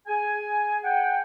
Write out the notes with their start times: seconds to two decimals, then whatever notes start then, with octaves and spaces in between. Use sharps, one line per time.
0.07 G#4 G#5
0.84 F#5 G5